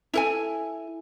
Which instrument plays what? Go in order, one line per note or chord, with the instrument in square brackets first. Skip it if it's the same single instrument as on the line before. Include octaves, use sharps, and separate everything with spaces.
[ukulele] E4 A4 G#5